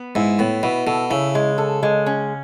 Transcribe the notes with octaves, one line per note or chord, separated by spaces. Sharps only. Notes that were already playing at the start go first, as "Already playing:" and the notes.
Already playing: B3
G#2 E4
A2 B3
B2 E4
B2 A4
C#3 E4
G#3
A4
G#3
C#4